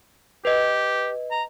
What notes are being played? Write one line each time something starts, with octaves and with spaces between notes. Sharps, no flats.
G4 B4 D#5
A#5